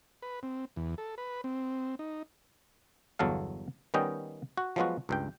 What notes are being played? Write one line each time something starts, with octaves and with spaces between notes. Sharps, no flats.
B4
C4
E2
A4
B4
C4
D#4
G1 E2 F#3 A4 F5
D#3 G3 B3 C#4 D#5 G5
F#4
F3 F#3 G#3 B3 F4 F#4
C#2 G2 G5